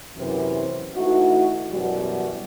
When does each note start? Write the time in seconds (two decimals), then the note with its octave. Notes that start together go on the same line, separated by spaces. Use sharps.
0.16 F#2 C3 E3
0.95 E3 A3 D#4 E4 F#4
1.72 F#2 B2 E3 F#3 G3 F#4